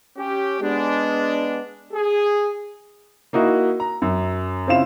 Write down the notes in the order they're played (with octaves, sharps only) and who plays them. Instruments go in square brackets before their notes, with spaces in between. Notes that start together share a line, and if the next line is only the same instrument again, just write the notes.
[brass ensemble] C#4 G4
G#3 B3 D4
G#4
[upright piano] A#3 D#4 E4 F#4
A#5
F#2
C#3 C4 E4 F4 F5 E7